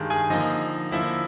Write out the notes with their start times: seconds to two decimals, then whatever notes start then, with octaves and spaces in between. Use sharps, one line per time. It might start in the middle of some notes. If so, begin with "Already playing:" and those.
Already playing: G2 D#3 G#3
0.10 G#4 G#5
0.30 D3 F3 A#3 D#4 D#5
0.91 D3 F3 A#3 E4 E5